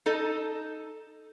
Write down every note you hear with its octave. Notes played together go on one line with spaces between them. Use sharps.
D#4 A4 D#5